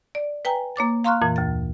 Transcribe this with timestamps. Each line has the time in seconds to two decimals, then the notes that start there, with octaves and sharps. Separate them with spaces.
0.15 D5
0.45 B4 G5 G#5 A#5
0.76 A#3 C#5 D6 A6
1.04 F5 A#5 C6 C#6 F6 F#6
1.21 F2 A#2 E3
1.36 D2 A6